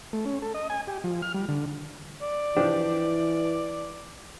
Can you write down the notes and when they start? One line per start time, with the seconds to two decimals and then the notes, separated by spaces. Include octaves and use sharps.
0.13 A3
0.25 C#4
0.42 A4
0.54 D#5
0.70 G#5
0.87 G4
1.04 F3
1.22 F6
1.34 G3
1.48 D3
2.21 D5
2.56 E3 F3 D4 G4